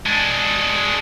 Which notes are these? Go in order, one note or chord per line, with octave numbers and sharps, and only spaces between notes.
G#3 D4